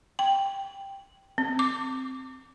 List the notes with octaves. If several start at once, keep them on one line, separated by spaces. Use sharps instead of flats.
G5
C4
D6